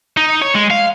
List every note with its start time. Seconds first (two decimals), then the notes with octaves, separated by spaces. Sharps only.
0.17 D#4
0.42 C#5
0.55 G#3
0.71 F5